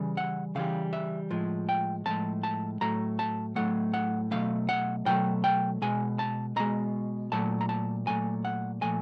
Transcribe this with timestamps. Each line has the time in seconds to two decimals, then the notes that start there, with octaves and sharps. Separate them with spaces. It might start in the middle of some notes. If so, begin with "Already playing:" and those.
Already playing: C#3 E3 G3
0.17 F#5
0.55 C#3 E3 G3 F5
0.93 E5
1.30 A2 F3 G#3
1.69 G5
2.06 A2 F3 G#3 A5
2.43 A5
2.81 A2 F#3 A3 A#5
3.19 A5
3.56 A2 F#3 A3 F#5
3.94 F#5
4.31 B2 F#3 A3 F5
4.69 F#5
5.06 B2 F#3 A3 G5
5.44 G5
5.82 B2 G#3 G#5
6.19 A5
6.56 B2 G#3 A#5
7.32 A#2 F#3 A3 A5
7.61 A#5
7.69 A5
8.07 A#2 F#3 A3 G#5
8.45 F#5
8.82 A#2 F3 A3 G#5